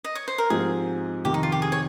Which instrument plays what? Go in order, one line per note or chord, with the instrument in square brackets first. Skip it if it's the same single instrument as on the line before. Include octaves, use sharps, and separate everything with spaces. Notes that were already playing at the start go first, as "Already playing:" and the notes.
[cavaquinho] D#5
C#5
C5
A#4
[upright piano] G#2 F3 C4 G4 [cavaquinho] G#4
[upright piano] F2 C3 D#3 [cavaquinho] G4
[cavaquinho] D#4
F4
G4
G#4
C#5